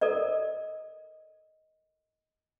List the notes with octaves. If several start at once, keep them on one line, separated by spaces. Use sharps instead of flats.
A4 A#4 D5 D#5